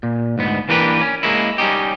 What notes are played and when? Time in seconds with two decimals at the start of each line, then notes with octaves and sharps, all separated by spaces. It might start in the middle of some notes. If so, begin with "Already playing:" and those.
0.03 A#2
0.38 D2 G#2 B3
0.69 E3 A#3 D4 G4 A#4 B4
1.01 C#4
1.23 G#3 A#3 C#4 E4
1.58 G3 C#4 D#4 G4